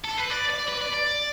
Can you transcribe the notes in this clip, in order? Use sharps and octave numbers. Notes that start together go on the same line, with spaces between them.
A4
B4
D5
D5
B4
D5
D5